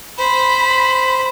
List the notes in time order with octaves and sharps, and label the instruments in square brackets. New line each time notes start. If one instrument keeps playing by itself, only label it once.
[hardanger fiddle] C5 [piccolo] B5